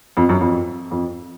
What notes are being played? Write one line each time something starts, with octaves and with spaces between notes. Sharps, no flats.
F2
F#2
F2
F2